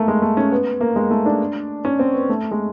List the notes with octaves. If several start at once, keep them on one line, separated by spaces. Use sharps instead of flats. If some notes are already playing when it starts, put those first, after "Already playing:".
Already playing: A3 A#3
G#3
A3
C#4
B3
A#3
G#3
A3
D4
C#4
C4
B3
A3
G#3